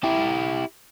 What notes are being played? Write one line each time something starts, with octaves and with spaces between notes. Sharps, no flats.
E4 G4